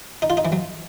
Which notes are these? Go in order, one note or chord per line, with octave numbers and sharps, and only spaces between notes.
D#4
F4
D#4
E3
F#3